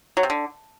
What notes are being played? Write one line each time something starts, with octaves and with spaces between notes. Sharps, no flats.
F#3
C3
D3